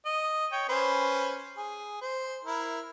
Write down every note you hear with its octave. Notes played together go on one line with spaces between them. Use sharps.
D#5
C#5 G5
C#4 B4 C5
G#4
C5
E4 A#4